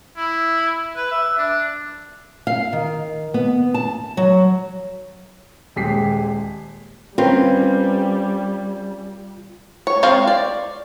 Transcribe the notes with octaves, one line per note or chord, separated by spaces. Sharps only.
E4
B4
E5
D4
F5
D#3
B3
A5
F#3
D#1 G#3 G4 B6 C7
G3 C4 C#4 F4 A#4 B4
C#5
G#3 C4 F4 C#5 F5
D5